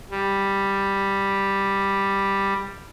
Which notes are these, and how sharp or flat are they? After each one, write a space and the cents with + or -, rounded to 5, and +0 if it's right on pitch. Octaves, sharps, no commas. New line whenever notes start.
G3 +5